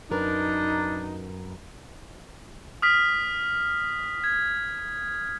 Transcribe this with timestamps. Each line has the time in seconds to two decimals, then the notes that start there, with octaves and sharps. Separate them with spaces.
0.11 F#2 D4 D#4 A#4 B4
2.82 D#6 F6 B6
4.24 G#6